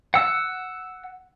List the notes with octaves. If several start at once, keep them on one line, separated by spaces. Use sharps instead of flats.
F#5 E6